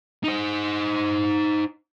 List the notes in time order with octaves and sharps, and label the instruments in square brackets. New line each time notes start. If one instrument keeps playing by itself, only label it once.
[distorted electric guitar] D#4 C5